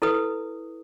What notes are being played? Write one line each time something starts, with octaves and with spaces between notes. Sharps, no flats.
E4 A4 B4 D#6